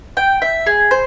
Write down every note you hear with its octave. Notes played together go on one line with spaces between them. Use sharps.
G5
E5
G#4
C5